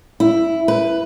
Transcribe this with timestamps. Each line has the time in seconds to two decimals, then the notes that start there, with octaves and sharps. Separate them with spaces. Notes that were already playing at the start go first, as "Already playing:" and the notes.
0.20 E4
0.68 B4